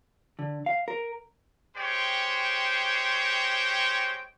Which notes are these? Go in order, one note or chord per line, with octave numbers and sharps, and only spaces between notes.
D3
F5
A#4
G#3 G4 C5 C#5 G5